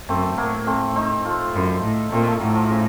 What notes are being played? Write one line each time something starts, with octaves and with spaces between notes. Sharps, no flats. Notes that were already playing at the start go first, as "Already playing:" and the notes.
F#2 A3 C4
A2 F#3 A#3
A3 C4
C4 D#4
F4 A4
F#2
A2
A#2 A3 C4
F3 A3
A2 F#3
F3
C#3